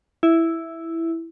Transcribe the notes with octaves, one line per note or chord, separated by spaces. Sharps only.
E4